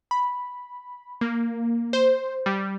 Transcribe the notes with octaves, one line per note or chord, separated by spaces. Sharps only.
B5
A#3
C5
G3